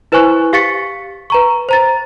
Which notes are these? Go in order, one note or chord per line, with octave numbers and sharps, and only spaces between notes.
E4 B4 C5 G#5 C#6 F#6
G4 F5 C#6 A6 B6 C#7
B4 A#5 C#6
C5 A#5 A6